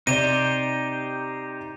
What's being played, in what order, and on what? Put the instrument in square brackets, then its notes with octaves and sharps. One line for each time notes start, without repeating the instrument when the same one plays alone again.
[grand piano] C3 D5 [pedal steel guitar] D#4 G4 C5 [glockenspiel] D#7